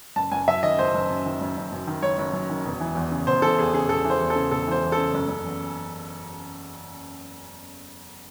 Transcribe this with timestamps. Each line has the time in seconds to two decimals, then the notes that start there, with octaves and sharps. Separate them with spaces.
0.16 F#1 A5
0.32 F#1 G#5
0.48 F#2 E5
0.63 D#3 D#5
0.79 F#1 C5
0.94 F#1
1.10 F#2
1.26 D#3
1.41 F#1
1.57 F#1
1.72 F#2
1.87 D#3
2.03 F#1 C#5
2.18 F#1
2.33 F#2
2.50 D#3
2.66 E1
2.80 E3
2.95 E2
3.11 C#3
3.27 E1 C5
3.42 E3 A4
3.59 E2 G#4
3.74 C#3 G#4
3.88 E1 A4
4.05 E3
4.10 C5
4.21 E2
4.30 A4
4.35 C#3
4.51 E1 A4
4.67 E3 C5
4.83 E2
4.92 C#3 A4
5.14 F#1
5.28 F#1
5.45 E2